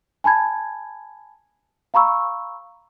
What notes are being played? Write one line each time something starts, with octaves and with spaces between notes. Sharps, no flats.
G#5 A5 B5 G#6
F5 A#5 B5 C#6 E6